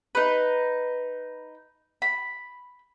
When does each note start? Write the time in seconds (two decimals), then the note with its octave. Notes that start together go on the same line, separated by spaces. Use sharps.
0.15 D#4 B4
2.02 B5